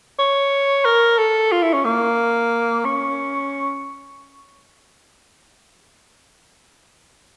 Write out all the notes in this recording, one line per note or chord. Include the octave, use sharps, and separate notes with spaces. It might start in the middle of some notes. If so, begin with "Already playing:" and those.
C#5
A#4
A4
F4
E4
C#4
A#3
C#4